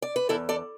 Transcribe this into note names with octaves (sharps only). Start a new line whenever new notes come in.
D5
B4
E2 E4 A4
A4 D5